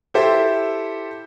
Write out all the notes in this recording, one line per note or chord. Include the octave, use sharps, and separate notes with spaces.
E4 G4 A4 C5 E5